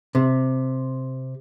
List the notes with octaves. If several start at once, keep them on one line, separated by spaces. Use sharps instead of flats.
C3